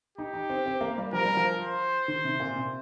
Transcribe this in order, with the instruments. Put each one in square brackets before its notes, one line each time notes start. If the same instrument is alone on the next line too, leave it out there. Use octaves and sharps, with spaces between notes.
[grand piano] D#4 [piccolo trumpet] G4
[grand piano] D#4
C4
C4
A#3
G3
[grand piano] F3 [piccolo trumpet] A#4
[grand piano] G3
F3
[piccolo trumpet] C5
[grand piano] D#3
C3
A#2
C3